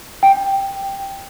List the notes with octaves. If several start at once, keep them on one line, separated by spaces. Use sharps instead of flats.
G5